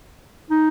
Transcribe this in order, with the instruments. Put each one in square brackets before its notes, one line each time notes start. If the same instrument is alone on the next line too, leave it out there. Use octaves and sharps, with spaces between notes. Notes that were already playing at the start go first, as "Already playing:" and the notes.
[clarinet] D#4